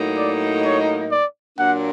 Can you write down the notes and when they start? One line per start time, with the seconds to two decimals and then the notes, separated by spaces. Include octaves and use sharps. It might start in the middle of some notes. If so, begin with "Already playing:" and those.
Already playing: A2 F#3 A#3 D#4
0.17 D5
0.64 C#5
1.11 D5
1.59 A#2 F#3 A#3 D4 F#5